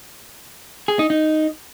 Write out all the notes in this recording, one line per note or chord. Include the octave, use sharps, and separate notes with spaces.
G#4
D#4
D#4